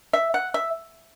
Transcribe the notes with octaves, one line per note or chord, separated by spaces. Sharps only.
E5
F#5
E5